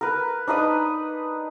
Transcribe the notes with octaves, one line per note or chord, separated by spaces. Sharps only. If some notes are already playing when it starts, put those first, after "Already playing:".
A#4 B4
D4 D#4 B4 D#6